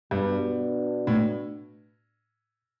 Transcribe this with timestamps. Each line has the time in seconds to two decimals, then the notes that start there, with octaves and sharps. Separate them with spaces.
0.11 G2 B2 B3 D4
1.07 A2